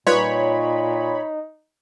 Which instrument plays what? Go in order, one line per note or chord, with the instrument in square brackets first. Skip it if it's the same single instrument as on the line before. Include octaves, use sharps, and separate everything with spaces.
[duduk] A#2 [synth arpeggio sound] G3 F4 B4 [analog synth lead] D#4 [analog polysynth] C#5 B5